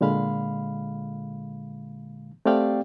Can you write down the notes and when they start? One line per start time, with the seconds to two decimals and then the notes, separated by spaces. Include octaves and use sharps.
0.01 A#2 D3 G#3 F5 B5
2.45 A3 C4 G4 D5 F5 G5